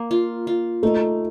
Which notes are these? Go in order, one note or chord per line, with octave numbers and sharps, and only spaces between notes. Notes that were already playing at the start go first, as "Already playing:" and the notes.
Already playing: A#3
F4
F4
A3 D#4